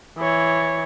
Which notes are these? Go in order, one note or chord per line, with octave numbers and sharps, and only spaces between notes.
E3 C#5